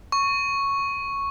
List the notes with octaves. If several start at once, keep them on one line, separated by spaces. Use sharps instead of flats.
C#6